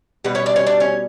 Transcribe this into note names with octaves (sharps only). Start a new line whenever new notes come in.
B2 G3 B3 B4
C#4 C#5
D4 D5
C#4 C#5
D4 D5
C#4 C#5